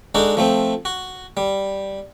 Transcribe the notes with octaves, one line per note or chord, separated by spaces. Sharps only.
G#3 D4 D#4 F#4 A4
F3 A3 C4
F#4
G3